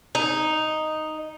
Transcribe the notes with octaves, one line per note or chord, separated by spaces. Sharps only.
D#4